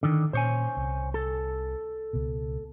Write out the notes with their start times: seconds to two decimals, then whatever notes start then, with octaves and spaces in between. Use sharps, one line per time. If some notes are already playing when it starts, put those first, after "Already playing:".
0.03 D3 D#3
0.33 A#2 C#4 C5 C#5 G#5
0.77 C2
1.14 A4
2.13 C#2 B2